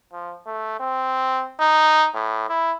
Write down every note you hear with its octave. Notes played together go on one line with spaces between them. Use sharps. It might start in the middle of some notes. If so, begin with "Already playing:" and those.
F3
A3
C4
D#4
A2
E4